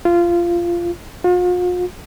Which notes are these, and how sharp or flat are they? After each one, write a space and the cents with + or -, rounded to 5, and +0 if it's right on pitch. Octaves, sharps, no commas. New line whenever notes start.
F4 -15
F4 +45